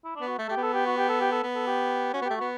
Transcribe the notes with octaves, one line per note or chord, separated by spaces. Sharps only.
E4
D4
B3
F#4
A3 A4
A3 G4
B3
A4
G4
F#4
G4
A4
G4
A4
B3
A4
G4
C#4 F#4
B3 G4
A3
B3 F#4